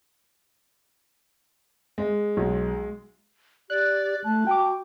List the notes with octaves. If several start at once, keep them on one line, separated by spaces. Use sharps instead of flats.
G#3
B1
G4 D5 F#6
A3 A5
F#4 G5 D6